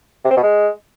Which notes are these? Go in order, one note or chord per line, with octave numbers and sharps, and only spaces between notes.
C3
C4
B2
G#3